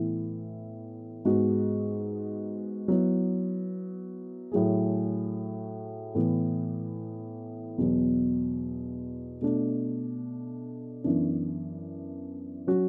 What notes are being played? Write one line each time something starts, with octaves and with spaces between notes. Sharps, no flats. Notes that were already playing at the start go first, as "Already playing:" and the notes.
Already playing: A2 E3 B3 E4
G#2 G#3 B3 F#4
F#3 B3 E4
A2 F#3 A3 E4 G#4
A2 E3 B3
E2 B2 F#3 B3
B2 A3 D4
F#2 E3 B3 D4
F#3 C#4 F#4